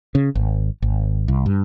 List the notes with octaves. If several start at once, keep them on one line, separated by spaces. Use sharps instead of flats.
C#3
G#1
G#1
C2
G2